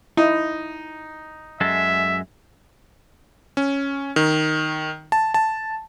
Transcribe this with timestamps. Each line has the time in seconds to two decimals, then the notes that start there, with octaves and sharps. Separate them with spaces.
0.17 D#4 E4
1.61 F#2 G#3 A4 E5
3.57 C#4
4.16 D#3
5.12 A5
5.34 A5